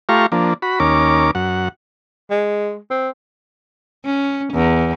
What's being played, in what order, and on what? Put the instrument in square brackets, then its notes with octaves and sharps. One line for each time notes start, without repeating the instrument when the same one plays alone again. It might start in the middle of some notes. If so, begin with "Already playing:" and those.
[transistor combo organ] A3 F4 G4 F5 A#5 C#6
F3 A#3 D4
F#4 B5
D#2 C#4 A#4 D6
F#2 F#5
[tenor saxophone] G#3
C4
[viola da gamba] C#4
E2